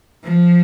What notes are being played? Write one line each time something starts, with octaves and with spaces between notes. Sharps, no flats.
F3